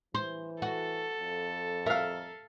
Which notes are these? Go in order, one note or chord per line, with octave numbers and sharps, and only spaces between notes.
E3 C5
F#4 A4
F2
A#4 E5 F5